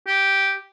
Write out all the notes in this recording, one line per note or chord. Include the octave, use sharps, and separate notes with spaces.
G4